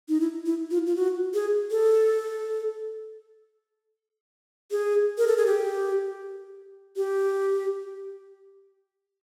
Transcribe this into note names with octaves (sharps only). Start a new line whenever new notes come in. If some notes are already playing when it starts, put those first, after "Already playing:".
D#4
E4
E4
F4
F4
F#4
G#4
A4
G#4
A#4
A4
G#4
G4
G4